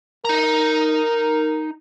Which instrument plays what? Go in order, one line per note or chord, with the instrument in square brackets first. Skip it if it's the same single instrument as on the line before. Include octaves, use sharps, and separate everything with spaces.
[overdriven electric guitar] D#4 A#5 [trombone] A#4